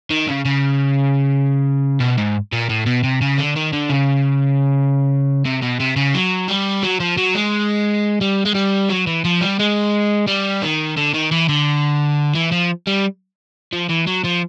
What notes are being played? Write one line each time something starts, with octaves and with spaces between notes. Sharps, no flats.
D#3
C#3
C#3
B2
G#2
A#2
A2
B2
C3
C#3
D3
D#3
D3
C#3
C3
B2
C3
C#3
F#3
G3
F#3
F3
F#3
G#3
G3
G#3
G3
F#3
E3
F3
G3
G#3
G3
D#3
D3
D#3
E3
D3
E3
F3
G3
F3
E3
F#3
F3